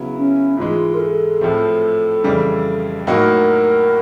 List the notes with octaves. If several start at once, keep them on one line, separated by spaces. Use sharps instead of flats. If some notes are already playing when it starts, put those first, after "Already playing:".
Already playing: C#3 F#3 B3 E4
C#4
G#2 E3 G#3 F4
A#4
A4
A2 F3 A3 C4
F2 C#3 E3 G3
A2 F#3 A#3 D#4 F#4 A#4